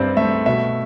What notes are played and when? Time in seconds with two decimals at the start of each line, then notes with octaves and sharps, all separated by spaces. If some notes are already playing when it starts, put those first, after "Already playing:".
Already playing: G2 C4 C5 D5 E5
0.17 A3 E5
0.46 B2 E5